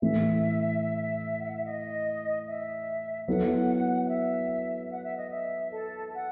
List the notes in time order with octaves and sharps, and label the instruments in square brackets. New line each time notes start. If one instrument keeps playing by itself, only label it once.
[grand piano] A2 E3 A3 E4 [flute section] E5
[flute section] F#5
E5
D#5
E5
[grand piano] F#3 B3 E4 A4 [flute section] F#5
[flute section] F#5
E5
F#5
E5
D#5
E5
A4
F#5